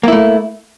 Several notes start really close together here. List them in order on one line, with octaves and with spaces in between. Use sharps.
A#3 E4 A3